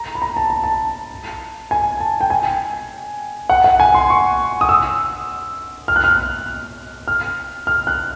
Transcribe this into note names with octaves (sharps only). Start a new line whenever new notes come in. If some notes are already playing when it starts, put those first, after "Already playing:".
Already playing: A#5
B5
A#5
A5
A#5
A5
G#5
A5
G5
G#5
F#5
F#5
G#5
C6
C#6
D#6
E6
F6
F#6
F6
F6
F6
F#6